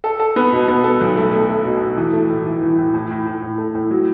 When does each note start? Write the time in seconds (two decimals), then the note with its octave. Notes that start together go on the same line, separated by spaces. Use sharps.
0.04 A4
0.20 A4
0.36 B3
0.53 B2
0.68 B3
0.84 A4
1.01 B1
1.17 A3
1.33 A3
1.49 A3
1.65 B2
1.81 B2
1.97 E3
2.13 A3
2.30 A2
2.46 E3
2.61 E3
2.78 A2
2.94 A2
3.11 A2
3.26 A2
3.42 A2
3.58 A3
3.75 A2
3.91 F#3